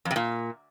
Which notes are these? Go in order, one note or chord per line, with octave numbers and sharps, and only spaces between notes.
F2
C3
A#2